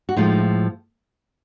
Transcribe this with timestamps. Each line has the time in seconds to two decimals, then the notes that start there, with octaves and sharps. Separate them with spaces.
0.09 F#4
0.16 A2 F3 G#3 D#4 F4